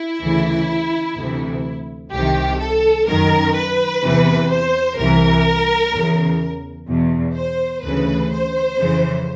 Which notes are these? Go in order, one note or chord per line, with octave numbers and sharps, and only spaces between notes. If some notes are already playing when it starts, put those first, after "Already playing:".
Already playing: E4
D2 C#3 E3
D2 C3 E3
C2 C3 D#3 G4
A4
F#2 D#3 A#4
B4
E2 C3 E3
C5
C2 C3 E3 A#4
E2 C#3 E3
E2 B2
C5
D2 C#3 E3 B4
C5
F2 C#3 E3